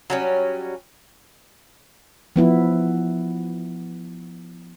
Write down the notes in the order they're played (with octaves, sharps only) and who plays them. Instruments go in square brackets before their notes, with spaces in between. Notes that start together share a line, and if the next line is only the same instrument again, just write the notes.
[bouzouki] F#3 G3 C#4
[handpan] F3 B3 E4